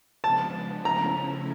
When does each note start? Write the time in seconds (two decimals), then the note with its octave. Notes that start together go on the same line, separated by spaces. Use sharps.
0.24 C#3 F3 G#3 B3 D4 A5
0.85 C#3 F3 A3 C#4 E4 A#5